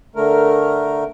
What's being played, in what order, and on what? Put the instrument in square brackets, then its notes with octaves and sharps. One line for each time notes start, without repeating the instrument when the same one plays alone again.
[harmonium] D3 A3 A#4